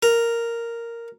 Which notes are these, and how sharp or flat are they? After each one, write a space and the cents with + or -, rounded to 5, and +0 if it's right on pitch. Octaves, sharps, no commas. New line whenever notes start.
A#4 -5